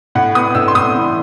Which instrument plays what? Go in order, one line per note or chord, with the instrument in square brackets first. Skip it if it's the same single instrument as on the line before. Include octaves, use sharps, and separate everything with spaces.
[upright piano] A2 F#5
B3 D#6
A2 E6
C6
A2 D#6
E3